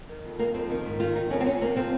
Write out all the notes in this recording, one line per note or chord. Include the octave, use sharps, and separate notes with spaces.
D#3
F2
D#3 A#3
F2 C4
D#3
G#2
D#3 F4
G#2 D#4
F2 C#4
C4
F2 C#4
C3 A#3
F3 C4